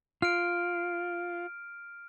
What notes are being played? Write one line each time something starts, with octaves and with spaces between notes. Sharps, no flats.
F4 F6 D7